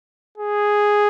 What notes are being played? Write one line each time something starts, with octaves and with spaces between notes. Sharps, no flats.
G#4